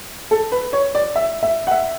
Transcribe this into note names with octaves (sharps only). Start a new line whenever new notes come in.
A4
B4
C#5
D5
E5
E5
F#5
E5